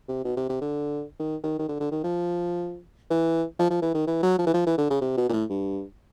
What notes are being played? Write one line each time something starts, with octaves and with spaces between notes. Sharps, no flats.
C3
B2
C3
C3
D3
D#3
D#3
D#3
D3
D3
D#3
F3
E3
F3
F3
E3
D#3
E3
F#3
F3
E3
F3
E3
D3
C#3
C3
B2
A#2
A2
G2